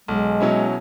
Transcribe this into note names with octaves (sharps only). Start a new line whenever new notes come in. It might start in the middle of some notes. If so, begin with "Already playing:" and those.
B1 G#3
B2 F#3 C#4 E4